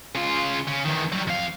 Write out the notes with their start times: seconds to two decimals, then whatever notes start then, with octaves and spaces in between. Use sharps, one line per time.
0.15 C#3 F4
0.67 C#3
0.85 E2 D#3
1.12 F#3 G3
1.27 F2 F5